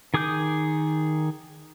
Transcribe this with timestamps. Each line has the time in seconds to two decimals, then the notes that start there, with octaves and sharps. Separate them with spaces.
0.14 D#3 G#4 D6 D#6 G6